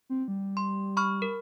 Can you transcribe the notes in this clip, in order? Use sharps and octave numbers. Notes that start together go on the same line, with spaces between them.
C4
G3
C6
B5 C#6 F6
A#4